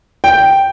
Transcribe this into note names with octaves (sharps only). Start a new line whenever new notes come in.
G5